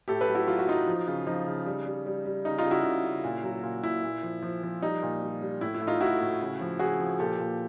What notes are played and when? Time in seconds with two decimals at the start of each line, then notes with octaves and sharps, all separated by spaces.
0.08 A2 G4 A4
0.21 A4 B4
0.28 F#3
0.35 E4 F#4
0.47 F#3 F4
0.59 F#4
0.68 F#3 D#4 F4
0.87 F3
1.07 C#3
1.27 F3 D#4
1.47 C#3
1.66 G3
1.86 G3
2.06 G3
2.26 G3
2.45 C#3 D#4
2.58 D#4 F4
2.65 C#3
2.71 E4 F#4
2.85 C#3
3.05 C#3
3.24 A#2
3.44 F#3
3.63 A#2
3.84 A#2 E4
4.04 A#2
4.23 F3
4.42 F3
4.63 F3
4.82 G3 D#4
5.03 A#2
5.22 G3
5.41 G3
5.61 A2 E4
5.74 E4
5.82 A2
5.87 D#4 F4
6.01 A2 E4 F#4
6.21 A2
6.41 C#3
6.61 F3
6.79 C#3 F#4 G#4
7.00 F3
7.19 A#2 G4 A4
7.40 A#2